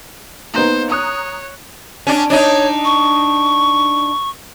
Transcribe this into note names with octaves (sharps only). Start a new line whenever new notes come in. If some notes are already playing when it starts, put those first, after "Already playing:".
A#3 B3 D#4 C5
C#5 A#5 D#6 F#6
C#4 D4
D4 D#4 C#5
C#6